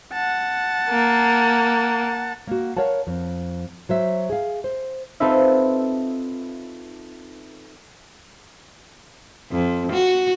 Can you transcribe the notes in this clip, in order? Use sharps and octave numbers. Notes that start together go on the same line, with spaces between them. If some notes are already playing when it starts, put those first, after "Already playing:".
F#5 A5
A#3
A#3 F#4
A#4 C#5 F5 F#5 A5
F2
F#3 C5 E5
G#4 F5
C5
C4 D#4 F4 A4 B4 E5
F2
F#4